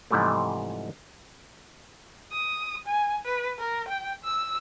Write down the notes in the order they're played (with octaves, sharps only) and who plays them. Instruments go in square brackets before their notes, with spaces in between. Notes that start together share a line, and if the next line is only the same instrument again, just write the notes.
[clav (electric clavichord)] G#2 C3 E3 F3 G3 A3
[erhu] D#6
G#5
B4
A#4
G5
E6